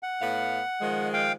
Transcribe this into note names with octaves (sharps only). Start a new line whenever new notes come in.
F#5
A2 B3 F5
D#3 F3 G#3
F5 G5